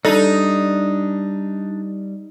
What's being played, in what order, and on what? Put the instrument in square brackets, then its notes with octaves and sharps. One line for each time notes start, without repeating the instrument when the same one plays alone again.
[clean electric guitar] G3 [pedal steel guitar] D4 [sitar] D#4 [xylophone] A4